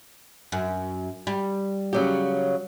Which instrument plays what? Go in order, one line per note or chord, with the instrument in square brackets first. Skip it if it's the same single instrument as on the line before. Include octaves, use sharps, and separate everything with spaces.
[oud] F#2
G3
[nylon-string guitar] C#3 F#3 G4